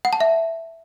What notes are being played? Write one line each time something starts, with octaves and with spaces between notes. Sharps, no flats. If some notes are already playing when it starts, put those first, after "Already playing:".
F#5
A5
E5